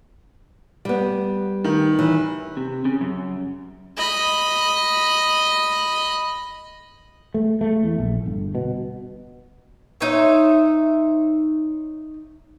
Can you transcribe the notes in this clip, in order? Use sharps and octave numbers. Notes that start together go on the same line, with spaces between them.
G3 B3
D#3
E3
C3
C#3
F#2
D#5 B5
A3
A3
E2
A#1
G1
B2
D#4 C5 C#5 E5